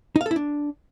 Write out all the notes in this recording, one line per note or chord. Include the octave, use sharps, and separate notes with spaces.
D#4
F5
A4
E4
D4